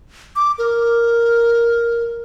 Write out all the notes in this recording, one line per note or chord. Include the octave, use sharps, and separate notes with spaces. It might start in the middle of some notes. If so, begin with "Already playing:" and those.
D6
A#4